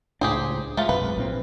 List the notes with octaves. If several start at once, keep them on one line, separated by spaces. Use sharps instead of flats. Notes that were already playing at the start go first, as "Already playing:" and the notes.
C#2 A2 D4 G4 G#4 C5
G#3 A3 F4
B1 F#2 C3 B4
A#1 A#2 C4